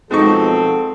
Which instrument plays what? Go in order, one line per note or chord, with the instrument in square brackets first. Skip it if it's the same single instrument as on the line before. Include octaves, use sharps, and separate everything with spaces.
[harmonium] B2 F3 F#3 [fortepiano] G#3 D#4 C#6 [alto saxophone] C4 [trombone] A4